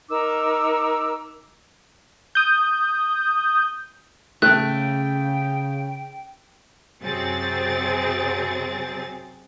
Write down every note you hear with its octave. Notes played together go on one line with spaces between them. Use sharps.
D#4 A#4 D6 E6
D#6 G6
C#3 A3 G5 F#6
F#2 C3 F#3 C4 G#4 A6